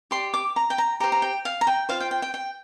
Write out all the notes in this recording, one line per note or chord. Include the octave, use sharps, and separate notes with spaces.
G4 D5 C6
D6
A#5
G5
A#5
G4 C5 A#5
A#5
G5
F5
A#5
G5
F4 C5 F5
G5
G5
G5
G5